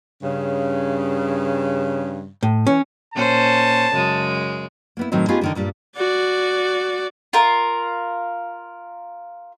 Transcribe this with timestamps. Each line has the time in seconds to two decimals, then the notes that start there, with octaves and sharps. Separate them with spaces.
0.22 G2 C#3
2.43 A2
2.67 E3 C#4
3.14 A#2 C#4 C5 A5
3.93 F#2 C#3 G#3
4.97 A#3 B3 E4
5.12 A2 D#3 F#3 C4 D#4
5.28 B3 C#4 D#4 F4 G4 G#4
5.41 D3 D#3 G3
5.55 G2 A#2 G3
5.97 F#4 D5
7.33 F4 A#4